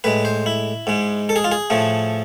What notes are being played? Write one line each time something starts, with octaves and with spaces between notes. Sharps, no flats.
A2 G#3 B4
C5
E4
G#2 G#3
A4
G#4
F4
G#4
A2 F3 A3